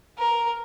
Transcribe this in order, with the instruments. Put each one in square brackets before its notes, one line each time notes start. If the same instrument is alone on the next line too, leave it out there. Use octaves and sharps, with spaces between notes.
[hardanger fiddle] A#4